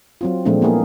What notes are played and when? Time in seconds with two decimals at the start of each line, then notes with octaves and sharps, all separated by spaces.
0.21 F#3 C4 F4
0.45 A#2 F3 G#3 A3 C4 D4
0.62 A#3 B3 E4 G#4 A#4